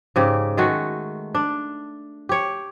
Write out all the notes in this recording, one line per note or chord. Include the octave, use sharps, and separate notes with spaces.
G#2 C#3 G4
D#3 G#3 A3 F#4
D4
G4 C#5